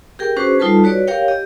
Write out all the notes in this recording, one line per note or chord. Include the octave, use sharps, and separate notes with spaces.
G4 G#4 A#4 G5
C#4 D4 F#4 G#4 B4 C5
G3 D#4 F4 A4 B4 A5
F#4 B4 C#5 D5
G4 A#4 C#5 F5 G5
G4 D#5